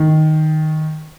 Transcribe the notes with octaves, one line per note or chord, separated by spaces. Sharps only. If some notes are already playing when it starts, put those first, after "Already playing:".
Already playing: D#3